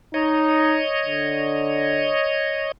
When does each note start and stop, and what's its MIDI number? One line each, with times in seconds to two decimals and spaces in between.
0.14 0.81 63
0.14 2.72 73
0.14 2.72 75
1.06 2.14 50